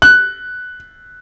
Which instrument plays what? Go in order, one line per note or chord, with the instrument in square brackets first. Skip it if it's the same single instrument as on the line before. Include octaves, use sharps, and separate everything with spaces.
[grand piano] F#6